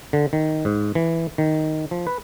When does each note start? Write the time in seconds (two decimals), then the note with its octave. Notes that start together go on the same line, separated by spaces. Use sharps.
0.13 D3
0.33 D#3
0.65 G#2
0.95 E3
1.38 D#3
1.91 F3
2.07 B4